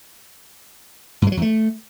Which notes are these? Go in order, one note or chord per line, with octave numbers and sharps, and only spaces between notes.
G2
G#3
F#3
E2
A3